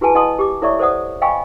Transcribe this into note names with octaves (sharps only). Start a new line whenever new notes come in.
E4 F#4 G#4 B4 G#5 A5
E4 D#5 F#5 A5 C6 D#6
G4 D6
E4 A4 C#5 D5 E5 C#6
A4 C5 D5 F#5 D#6
D#5 F5 G5 G#5 B5 C#6